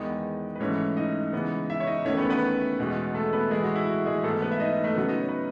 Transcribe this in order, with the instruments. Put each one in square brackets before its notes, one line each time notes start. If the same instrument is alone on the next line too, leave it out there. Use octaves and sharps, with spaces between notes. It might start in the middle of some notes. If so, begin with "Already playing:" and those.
Already playing: [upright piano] E2 D#3 G#3 B3 D#4 D#5
B4
G#2 E3 A3 C#4 C#5
D#4 D#5
C#3 E3 G#3 B3
E4 E5
C#5
D#4 D#5
E2 D#3 A3 C#4 C#5
B3 B4
C#5
B3 B4
E2 B2 G#3
A3 A4
B3 B4
A2 E3 G#3 A3 G#4
F#4
E4
F#4
G#3 G#4
G#2 E3 A3 B3 A4
B3 B4
E5
D#4 D#5
A3 A4
C#3 F#3 B3 B4
D#4 D#5
C#5
B4